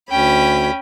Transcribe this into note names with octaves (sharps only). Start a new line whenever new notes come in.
D2 C#4 G5 B5